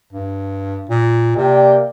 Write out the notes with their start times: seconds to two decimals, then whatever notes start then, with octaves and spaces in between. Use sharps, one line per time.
0.13 G2
0.89 A#2
1.36 C3 A#3 D5 G5